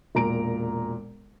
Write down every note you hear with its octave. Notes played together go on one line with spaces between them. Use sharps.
E1 A#2 A#5 D7